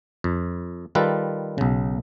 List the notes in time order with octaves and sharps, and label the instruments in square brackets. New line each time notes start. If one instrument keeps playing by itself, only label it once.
[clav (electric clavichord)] F2
D#3 G3 F4 A4 B4
B1 C#3